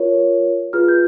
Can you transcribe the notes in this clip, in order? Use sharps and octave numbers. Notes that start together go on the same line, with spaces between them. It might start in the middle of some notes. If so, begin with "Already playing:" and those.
Already playing: F4 A#4 C#5
F4 G#4 B4 F6
G6